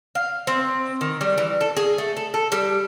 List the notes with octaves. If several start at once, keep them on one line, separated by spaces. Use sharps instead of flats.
F5
C4
D#3
G3
E3
A4
G#4
A3
A4
A4
G3